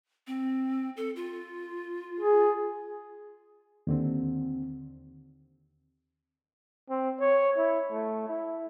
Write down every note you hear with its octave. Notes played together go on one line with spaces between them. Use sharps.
C4
A4
F4
G#4
D#2 D3 C4
C4
C#5
E4
A3
E4